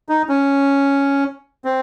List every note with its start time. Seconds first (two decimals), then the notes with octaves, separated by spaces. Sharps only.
0.09 D#4
0.29 C#4
1.65 C4